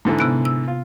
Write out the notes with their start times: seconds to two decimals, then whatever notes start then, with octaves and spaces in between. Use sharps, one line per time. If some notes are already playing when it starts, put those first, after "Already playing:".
0.05 G#2 D3 E3
0.19 C3 B3 F#6
0.45 E6
0.68 F4